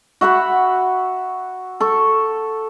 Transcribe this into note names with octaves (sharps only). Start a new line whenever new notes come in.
F#4 E5 F#5 B5
A4 C#6